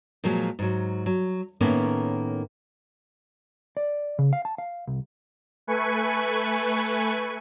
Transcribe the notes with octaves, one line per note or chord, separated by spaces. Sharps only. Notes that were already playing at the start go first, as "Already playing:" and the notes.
A#2 F3 F#3 G#3
G#2 F#3
F#3
A2 D#3 A#3 B3 C#4 C#5
D5
C#3
F5
A5
F5
C2
A3 B4 G#5 C#6